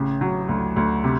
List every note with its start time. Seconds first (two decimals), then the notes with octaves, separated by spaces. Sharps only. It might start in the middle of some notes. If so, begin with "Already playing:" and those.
Already playing: A1 C#3
0.21 F#3
0.49 D2
0.76 D2
1.04 C3